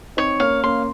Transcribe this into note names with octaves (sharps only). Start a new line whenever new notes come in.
C4 D#4 C#5
A#3 C#4 F5
A#3 C#4 C6